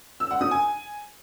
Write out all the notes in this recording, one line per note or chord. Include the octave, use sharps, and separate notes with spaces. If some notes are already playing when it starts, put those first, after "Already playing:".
E6
F#5
D#6
G#5